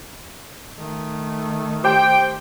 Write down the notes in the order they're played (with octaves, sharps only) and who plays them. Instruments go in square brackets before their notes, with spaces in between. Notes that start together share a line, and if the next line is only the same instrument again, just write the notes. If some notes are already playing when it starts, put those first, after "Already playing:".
[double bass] D#3 A3
[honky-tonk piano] G4 C5 D6 [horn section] G5